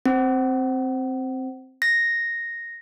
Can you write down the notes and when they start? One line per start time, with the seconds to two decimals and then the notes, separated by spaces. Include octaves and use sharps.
0.06 C4
1.82 A#6